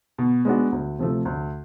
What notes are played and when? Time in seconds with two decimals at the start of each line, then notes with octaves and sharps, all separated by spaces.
0.18 B2
0.45 G#3 B3 D4 F#4
0.72 D2
0.99 C3 F3 A3
1.25 D2